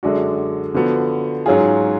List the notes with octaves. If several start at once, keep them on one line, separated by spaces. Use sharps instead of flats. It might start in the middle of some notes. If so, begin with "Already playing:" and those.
F#2 D3 G#3 D4 F#4
D3 F3 B3 F#4
G#2 F#3 C#4 F4 G#4